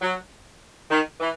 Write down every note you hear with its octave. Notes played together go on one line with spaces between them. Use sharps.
F#3
D#3
E3